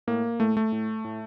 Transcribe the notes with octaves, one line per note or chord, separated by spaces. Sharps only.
A2 A#3
A2 A3
A3
A2
A2